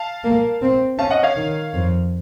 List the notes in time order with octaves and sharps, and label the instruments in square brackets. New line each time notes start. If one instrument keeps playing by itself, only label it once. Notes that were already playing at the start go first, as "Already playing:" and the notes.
Already playing: [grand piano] F5 A5
[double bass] A#3
C4
[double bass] C#4 [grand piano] F5 A5
[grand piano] D#5 F#5
C#5 F5
[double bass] D#3
F2